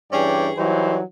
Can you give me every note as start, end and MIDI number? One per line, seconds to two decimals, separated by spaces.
0.12 0.51 43
0.12 0.51 52
0.12 0.51 61
0.12 0.51 68
0.12 0.51 74
0.12 0.51 79
0.58 1.01 52
0.58 1.01 54
0.58 1.01 55
0.58 1.01 63
0.58 1.01 72
0.58 1.01 73